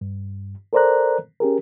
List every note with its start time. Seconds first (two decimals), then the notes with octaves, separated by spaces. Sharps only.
0.01 G2
0.73 A4 A#4 C5 D5 A#5 F#6
1.40 C#4 G4 G#4 A#4